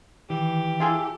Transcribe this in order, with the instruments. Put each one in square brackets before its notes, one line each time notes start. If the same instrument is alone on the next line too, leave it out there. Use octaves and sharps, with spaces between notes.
[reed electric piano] D#3 [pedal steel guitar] E3 [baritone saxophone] G4
[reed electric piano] E4 [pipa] F4 G#4 A4